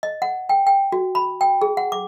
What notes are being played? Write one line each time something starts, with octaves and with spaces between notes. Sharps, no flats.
D#5
F#5
G5
G5
F#4
B5
G5
G#4
F#5
D6